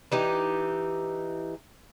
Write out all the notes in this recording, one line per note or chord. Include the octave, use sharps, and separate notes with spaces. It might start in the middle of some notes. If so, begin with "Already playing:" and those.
E3 D#4 G4